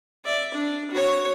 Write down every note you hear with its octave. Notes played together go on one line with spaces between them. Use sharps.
D5 E5
D4
F#4 C#5